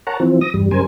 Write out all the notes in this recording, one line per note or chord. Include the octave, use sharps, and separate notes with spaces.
A#4 C#5 F#5 A5 A#5
E3 F3 C4
D#6 A#6
E2 G2 G3
F#2 C#3 G3 A#4 C5 G#5